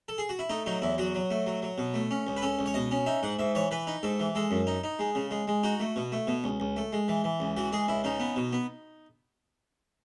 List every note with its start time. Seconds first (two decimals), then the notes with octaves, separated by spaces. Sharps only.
0.08 A4
0.18 G#4
0.29 F#4
0.39 E4
0.49 A3 D#4
0.66 F#3 D#4
0.82 E2 E4
0.98 F#3 F#4
1.15 F#3
1.30 A3
1.47 F#3
1.62 F#3
1.78 B2
1.94 A3
2.11 C#4
2.27 C#2
2.37 B4
2.42 C#4 A4
2.59 C#2
2.66 C#5
2.74 B2 D#5
2.91 C#4
3.06 D#4 E5
3.23 G#2 F#5
3.39 G#2 E5
3.55 E3 C#5
3.71 E3 B4
3.87 D#4
4.03 G#2 A4
4.20 E3
4.35 G#3 A4
4.51 F#2
4.67 D#4
4.84 D#4
4.99 G#3
5.15 C#3
5.31 G#3
5.47 G#3
5.63 D#4 F#4
5.80 A3
5.96 B2
6.12 A3
6.27 B2
6.44 C#2
6.60 C#2
6.76 A3
6.93 G#3
7.08 E3
7.24 E3
7.40 C#2
7.57 E3 F#4
7.72 G#3 G#4
7.88 C#2 E4
8.04 C#3 D#4
8.20 B3
8.36 B2
8.53 B3